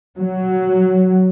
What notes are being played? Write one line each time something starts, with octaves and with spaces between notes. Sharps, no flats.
F#3